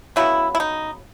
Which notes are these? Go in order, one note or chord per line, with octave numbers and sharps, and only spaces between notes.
C#3 F#3 B3 E4
E4
D#4